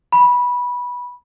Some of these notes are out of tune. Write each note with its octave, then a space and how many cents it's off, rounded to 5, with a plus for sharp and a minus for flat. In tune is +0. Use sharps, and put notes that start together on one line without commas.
B5 -15